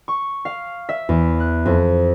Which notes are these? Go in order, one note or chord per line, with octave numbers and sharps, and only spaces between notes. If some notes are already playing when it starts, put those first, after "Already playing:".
C#6
F5
E5
E2
F#6
F2